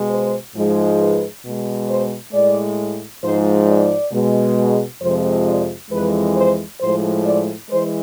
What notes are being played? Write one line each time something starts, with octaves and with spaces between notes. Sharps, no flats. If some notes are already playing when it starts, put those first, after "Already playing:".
Already playing: B2 G#3
C5
G#2 F3 G#3
B4
B2 G#3
C5
A2 G#3 D5
G#2 F3 G#3 C5
D5
B2 G#3
F2 C3 F3 G#3 C5
D5
F2 E3 G#3 B4
C5
A2 F3 G#3 C5
D5
E3 G#3 C5